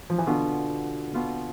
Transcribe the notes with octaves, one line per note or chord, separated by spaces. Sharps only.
F3
E3
B2 D3 B3 F4
B2 B3 F4